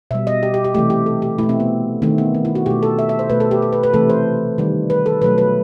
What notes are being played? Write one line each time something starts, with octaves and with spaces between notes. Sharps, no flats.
B2 G3 E5
D#5
G4
G4
G4
C3 E3 A3 G4
G4
A4
G4
B2 A3 E4
C4
B3
D#3 A3 C4
B3
C4
E4
F#4
B2 A3 G4
A4
E5
E5
C5
B2 A3 B4
A4
G4
A4
B4
B4
C3 E3 A3 A4
C5
D#3 G3
B4
A4
B2 F#3 A3 B4
B4